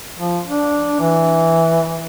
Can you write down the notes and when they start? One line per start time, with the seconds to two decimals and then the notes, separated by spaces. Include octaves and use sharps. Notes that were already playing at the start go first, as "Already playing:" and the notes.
0.19 F3
0.47 D4
1.01 E3